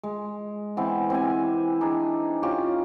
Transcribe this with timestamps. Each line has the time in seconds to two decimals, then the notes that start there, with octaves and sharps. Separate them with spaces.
0.03 G#3
0.77 E3 B3 C4
1.10 C4 G4 G#5
1.81 D4 D#4 G#4
2.43 C#4 F4 G4